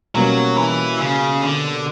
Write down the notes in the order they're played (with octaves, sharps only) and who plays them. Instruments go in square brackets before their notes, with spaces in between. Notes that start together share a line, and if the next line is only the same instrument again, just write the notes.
[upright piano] B2 G3 A#3 C#4 [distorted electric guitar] F#3
[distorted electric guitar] E3
C#3
D3